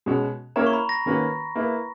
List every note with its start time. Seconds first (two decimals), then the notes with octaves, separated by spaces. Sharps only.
0.06 B2 G#3 C#4 F#4
0.56 A#3 C#4 E4 A#4 C#5 A#5
0.66 C#6
0.73 B5
0.89 A#6
1.06 D#3 A#3 C#4 F#4 B4
1.55 A#3 E4 B4